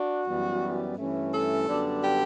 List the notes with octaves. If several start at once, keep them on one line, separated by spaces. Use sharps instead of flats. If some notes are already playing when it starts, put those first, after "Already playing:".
Already playing: D4 F#4
F#2 E3 G3 B3
G2 E3 A3 C#4
A4
F#2 D3 G3 B3 D4
G4